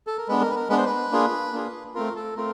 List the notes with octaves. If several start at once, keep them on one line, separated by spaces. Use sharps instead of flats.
A4
A#4
G#3 B3 D4 B4
A#4
B4
A#4
G#3 B3 D4 B4
C5
B4
A#3 D4 F4 G#4
A#3 D4 F4 G#4
A3 C4 F4 A#4
A4
A3 C4 F4 A#4